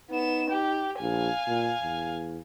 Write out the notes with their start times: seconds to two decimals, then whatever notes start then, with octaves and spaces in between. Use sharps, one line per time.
0.10 B3 D#4 E7
0.50 G4
1.00 A#1 F5 G#5
1.47 A#2
1.81 E2